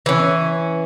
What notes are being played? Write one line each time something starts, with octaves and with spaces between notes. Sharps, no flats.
E3 C#4